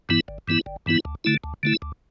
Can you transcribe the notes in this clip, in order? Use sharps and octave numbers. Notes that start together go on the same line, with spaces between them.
G2 E3 B3 E4
G1
G2 E3 B3 E4
G1
G2 E3 B3 E4
D2
D3 A3 E4
D2
D3 A3 E4
D2